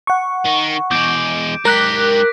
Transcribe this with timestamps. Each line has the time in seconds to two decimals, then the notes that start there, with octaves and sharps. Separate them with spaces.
0.07 F#5 C#6
0.46 D#3
0.91 E2 G#3 D6 G6 D7
1.65 G#2 G4 A#4 F#6 A#6 B6